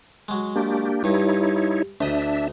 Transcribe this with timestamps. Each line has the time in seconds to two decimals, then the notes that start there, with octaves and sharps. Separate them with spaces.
0.28 F#3 G#3
0.56 A#3 D4 G4
1.04 G2 D#4 E4 C#5
2.01 D2 D4 D#5 E5